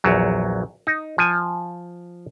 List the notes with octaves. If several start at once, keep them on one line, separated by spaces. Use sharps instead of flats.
A#1 E2 F#3
D#4
F3 G#5